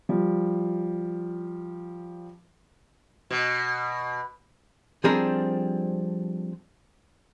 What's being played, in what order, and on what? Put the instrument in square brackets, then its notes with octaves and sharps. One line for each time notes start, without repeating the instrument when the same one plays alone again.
[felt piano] F3 G3
[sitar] B2
[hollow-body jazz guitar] F3 G3 C4 D4 G#4 A#4